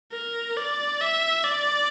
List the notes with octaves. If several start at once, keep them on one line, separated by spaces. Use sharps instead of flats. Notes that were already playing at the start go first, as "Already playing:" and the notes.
A#4
D5
E5
D5